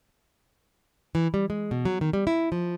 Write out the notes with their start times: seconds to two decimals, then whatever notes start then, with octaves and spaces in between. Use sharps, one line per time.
1.15 E3
1.34 G3
1.50 G#3
1.71 B2
1.85 F#3
2.01 D#3
2.13 G3
2.27 E4
2.52 F3